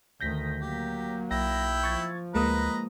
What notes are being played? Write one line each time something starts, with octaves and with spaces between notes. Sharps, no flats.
D2 D#3 G6 A#6 B6
F#3 A#3 G4
B1 E4 G5 E6 A#6
F3 C#6 G#6 A6
D2 G#3 A#3 B4 D#5 A#5 D#6